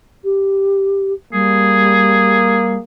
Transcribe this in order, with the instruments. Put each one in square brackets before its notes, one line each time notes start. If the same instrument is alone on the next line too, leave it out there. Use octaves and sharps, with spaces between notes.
[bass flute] G4
[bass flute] G3 [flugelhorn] A#3 [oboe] G#4